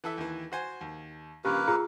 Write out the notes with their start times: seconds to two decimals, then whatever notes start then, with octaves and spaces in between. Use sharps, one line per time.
0.04 E3 A4 E5
0.18 D#2 E3
0.52 F#4 C5 G#5
0.81 D#2
1.45 G2 C#3 F3 A#3 G4 A#4 B4
1.68 F4 G#4 F5 A#5 E6